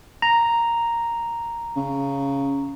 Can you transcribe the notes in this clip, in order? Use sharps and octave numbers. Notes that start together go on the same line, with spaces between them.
A#5
C#3